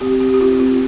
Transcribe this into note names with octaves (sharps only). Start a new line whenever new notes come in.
C4 G4
C4 G4
G4
C4 F4
C4 F4